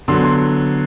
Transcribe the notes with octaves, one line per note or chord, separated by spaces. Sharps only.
D3 F#3 B3 C6
C6